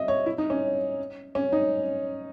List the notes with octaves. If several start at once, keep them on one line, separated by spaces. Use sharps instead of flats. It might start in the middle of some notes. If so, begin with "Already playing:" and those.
Already playing: D#5 E5
C#5
E4
D#4
C#4
C#4
D#4